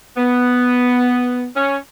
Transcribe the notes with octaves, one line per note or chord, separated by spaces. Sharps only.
B3
C#4